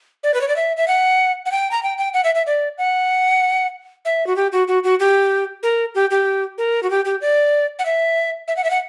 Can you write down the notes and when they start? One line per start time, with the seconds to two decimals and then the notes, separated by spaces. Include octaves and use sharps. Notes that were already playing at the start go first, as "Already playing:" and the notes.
0.23 D5
0.34 B4
0.41 C#5
0.48 D5
0.56 E5
0.77 E5
0.88 F#5
1.46 F#5
1.52 G5
1.71 A#5
1.83 G5
1.98 G5
2.14 F#5
2.24 E5
2.35 E5
2.47 D5
2.78 F#5
4.05 E5
4.27 F#4
4.36 G4
4.52 F#4
4.68 F#4
4.84 F#4
5.00 G4
5.63 A#4
5.95 G4
6.11 G4
6.58 A#4
6.83 F#4
6.90 G4
7.05 G4
7.21 D5
7.79 F#5
7.86 E5
8.48 E5
8.57 F#5
8.64 E5
8.71 F#5